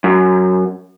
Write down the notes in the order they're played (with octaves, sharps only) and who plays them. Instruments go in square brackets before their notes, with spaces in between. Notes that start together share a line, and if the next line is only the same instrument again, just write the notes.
[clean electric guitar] F#2